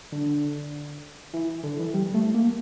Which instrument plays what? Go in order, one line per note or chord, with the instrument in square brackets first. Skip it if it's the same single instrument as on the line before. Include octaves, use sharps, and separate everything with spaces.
[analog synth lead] D3
E3
D3
E3
G3
A3
A#3